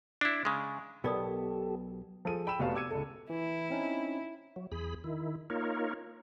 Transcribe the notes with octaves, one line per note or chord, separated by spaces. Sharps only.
D4 E4
C#3 G#3
B1 B2 B3 G4 A4 A#4 D5 D#6
F3 G#4 A4 D#7
G5 B5 E6 E7
F1 B3 F#4 G4 F5 A5
D6 E6 G#6 C#7 D#7
C#2 A4
E3 E4
C4 C#4 D#4
F#3
E2 G#4 B5
D#3 E4
A#3 D#4 F4 A#4 C#5